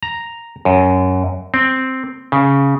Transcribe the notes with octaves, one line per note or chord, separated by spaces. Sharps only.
A#5
F#2
C4
C#3